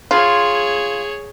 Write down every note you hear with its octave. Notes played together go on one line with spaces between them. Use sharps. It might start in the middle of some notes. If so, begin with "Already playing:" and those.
F4 G#4 C#5